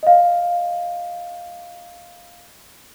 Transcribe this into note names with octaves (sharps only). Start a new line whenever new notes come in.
D#5 F5